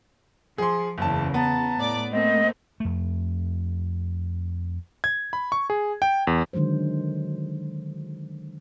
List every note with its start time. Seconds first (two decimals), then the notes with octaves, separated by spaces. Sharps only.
0.58 F3 G#4 C6
0.98 F#1 E2 C#3 A5
1.34 B3 A5 A#5
1.77 A2 D5 D6
2.12 A3 A#3 C4 D#5
2.80 F2 A3
5.04 G#6
5.33 B5
5.52 C#6
5.70 G#4
6.02 G5
6.27 E2
6.53 D3 D#3 F#3 G#3 C5